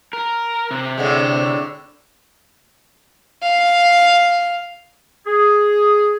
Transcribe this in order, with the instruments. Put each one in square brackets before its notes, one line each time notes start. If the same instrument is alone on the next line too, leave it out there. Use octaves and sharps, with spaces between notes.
[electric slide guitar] A#4
C3
[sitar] A2 D3 G#3
[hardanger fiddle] F5
[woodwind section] G#4